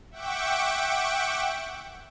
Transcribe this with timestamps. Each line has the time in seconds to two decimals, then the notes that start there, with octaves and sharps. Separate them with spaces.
0.11 E5 F#5 G5 C#6 D6